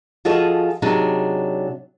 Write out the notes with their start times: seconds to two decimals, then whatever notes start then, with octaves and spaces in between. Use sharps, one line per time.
0.25 F3 F4 F#4 G#4 A4 D#5
0.82 C3 F#3 D4 D#4 G#4